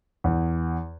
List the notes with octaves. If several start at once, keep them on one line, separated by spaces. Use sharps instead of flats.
E2